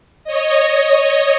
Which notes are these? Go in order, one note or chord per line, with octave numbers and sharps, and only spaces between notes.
C#5 D#5